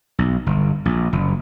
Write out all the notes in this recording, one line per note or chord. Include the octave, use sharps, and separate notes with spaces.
B1
G1
A#1
F#1